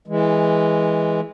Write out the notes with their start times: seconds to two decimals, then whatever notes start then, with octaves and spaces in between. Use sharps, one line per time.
0.08 E3 G#3